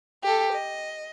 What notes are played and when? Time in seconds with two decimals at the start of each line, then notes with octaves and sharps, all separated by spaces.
0.24 G4 A4
0.53 D#5